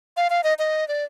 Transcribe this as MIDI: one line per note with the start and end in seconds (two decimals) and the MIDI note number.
0.17 0.28 77
0.30 0.41 77
0.44 0.54 75
0.59 0.87 75
0.88 1.04 74